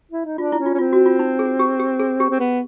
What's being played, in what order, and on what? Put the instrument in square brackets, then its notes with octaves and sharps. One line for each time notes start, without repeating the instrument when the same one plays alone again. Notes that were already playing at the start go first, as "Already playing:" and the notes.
[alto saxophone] E4
D#4
[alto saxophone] D4 [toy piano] F4
[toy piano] E4
[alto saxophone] C#4
[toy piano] F4
[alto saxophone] C#4
[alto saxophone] C4 [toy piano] F4
[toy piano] F#4
F4
D#4
G#4
G4
G4
G#4
G4
[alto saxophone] C4
B3